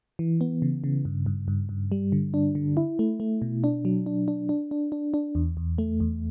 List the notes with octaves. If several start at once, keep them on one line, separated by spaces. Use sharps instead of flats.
E3
B3
C#3
C#3
G2
G2
G2
G2
G3
D3
D4
D3
E4
A3
A3
B2
D4
F#3
D4
D4
D4
D4
D4
D4
E2
E2
A3
E2